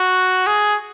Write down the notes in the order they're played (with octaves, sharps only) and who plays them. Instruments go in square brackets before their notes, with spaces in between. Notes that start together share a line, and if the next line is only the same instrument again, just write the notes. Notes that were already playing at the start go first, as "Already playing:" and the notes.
Already playing: [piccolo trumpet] F#4
G#4